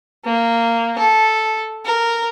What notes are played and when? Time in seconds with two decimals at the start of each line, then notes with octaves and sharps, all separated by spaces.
0.25 A#3
0.98 A4
1.85 A#4